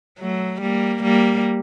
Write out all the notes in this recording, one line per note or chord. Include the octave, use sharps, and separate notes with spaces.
F#3 A3
G3 A#3
G3 A#3